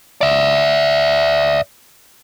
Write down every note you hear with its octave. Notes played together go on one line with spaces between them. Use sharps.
D5 E5